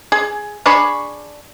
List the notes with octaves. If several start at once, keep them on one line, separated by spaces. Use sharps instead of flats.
G#4
D4 G#4 B5 C#6